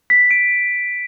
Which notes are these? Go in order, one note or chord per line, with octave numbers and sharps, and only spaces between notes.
B6
D7